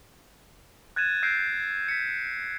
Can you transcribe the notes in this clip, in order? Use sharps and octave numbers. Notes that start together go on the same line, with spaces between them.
F#6 G#6 A6 D#7 E7
E6 G6 A6 A#6 C7 D7
B6 C#7